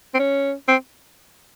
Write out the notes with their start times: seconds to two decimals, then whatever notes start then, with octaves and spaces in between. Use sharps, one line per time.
0.14 C4
0.19 C#4
0.68 C4